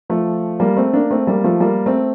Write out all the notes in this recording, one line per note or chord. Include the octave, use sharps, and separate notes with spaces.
F3 A3
G3 A#3
A3 C4
A#3 D4
A3 C4
G3 A#3
F3 A3
G3 A#3
A3 C4